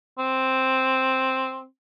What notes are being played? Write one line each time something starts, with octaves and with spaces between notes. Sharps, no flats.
C4